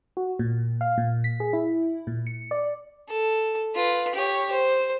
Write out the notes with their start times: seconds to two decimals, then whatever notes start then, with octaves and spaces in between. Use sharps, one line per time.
0.17 F#4
0.39 A#2
0.81 F5
0.98 A#2
1.24 B6
1.40 G#4
1.53 E4
2.07 A#2
2.27 C#7
2.51 D5
3.08 A4
3.75 F4 B4
4.15 G4 C#5
4.52 C5